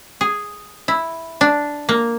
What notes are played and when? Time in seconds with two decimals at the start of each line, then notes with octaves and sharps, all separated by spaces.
0.21 G#4
0.88 E4
1.41 D4
1.89 A#3